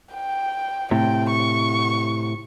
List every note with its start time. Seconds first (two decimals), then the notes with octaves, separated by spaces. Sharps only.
0.14 G5
0.91 A2 C3 G5
1.30 C#6